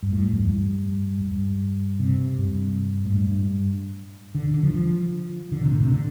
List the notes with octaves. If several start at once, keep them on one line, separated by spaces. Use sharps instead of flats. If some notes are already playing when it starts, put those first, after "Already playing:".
G2
A2
G2
F2
G2
G2
C3
G2
A2
G2
D3
D3
F3
F3
D3
C3
A2
C3
D3